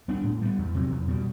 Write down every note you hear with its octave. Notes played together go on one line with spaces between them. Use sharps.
G3 B3 D4
A2
G3 B3
E2
C3 F#3
E2
B2 G3